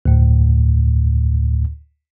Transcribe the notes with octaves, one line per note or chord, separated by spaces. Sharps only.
D2 A2